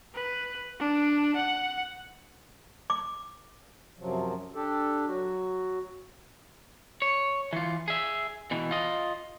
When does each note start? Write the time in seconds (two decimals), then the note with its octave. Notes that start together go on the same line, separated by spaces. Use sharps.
0.15 B4
0.80 D4
1.36 F#5
2.90 D6
3.99 F#2 C3 F3 F#3
4.55 D4 G4 A4
5.07 F#3 F#4
7.02 C#5
7.53 E3 F4
7.88 G#4 E5
8.51 B2 E3
8.71 F4 D#5